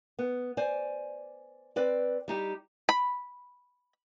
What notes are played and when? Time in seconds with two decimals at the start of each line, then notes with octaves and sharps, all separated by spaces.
0.19 B3
0.57 C5 D5 G#5
1.76 C4 B4 D5
2.28 G3 D#4 G4
2.89 B5